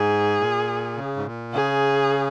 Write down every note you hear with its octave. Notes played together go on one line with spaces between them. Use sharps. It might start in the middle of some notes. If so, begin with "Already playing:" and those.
Already playing: G#2 G#4
A#2
C#3
G#2
A#2
C#3 G#4